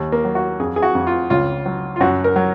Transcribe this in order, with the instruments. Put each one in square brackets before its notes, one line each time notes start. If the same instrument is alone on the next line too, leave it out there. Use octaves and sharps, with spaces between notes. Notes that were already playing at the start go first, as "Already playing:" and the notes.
Already playing: [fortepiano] D#2
A#3
F#3
F#4
F2 G#4
G#4
F#4
F2
F4
C#2 F4
F#3
F4
F#2 F#4
A#4
F#3